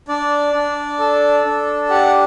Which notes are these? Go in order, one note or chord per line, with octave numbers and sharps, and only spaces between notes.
D4 D5
D4
A4
D4
G4 F#5